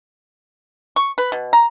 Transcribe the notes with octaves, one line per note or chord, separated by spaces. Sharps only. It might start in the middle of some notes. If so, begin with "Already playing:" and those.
C#6
B4
B2
A#5